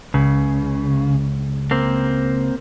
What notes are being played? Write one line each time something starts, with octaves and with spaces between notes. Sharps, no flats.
C#2 C#3
A#3 C4